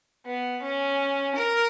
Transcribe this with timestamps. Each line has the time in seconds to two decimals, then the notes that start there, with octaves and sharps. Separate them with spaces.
0.26 B3
0.62 C#4
1.36 A#4